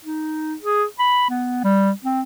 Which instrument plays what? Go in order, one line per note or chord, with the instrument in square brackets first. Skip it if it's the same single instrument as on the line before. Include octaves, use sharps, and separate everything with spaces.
[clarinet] D#4
G#4
B5
B3
G3
C4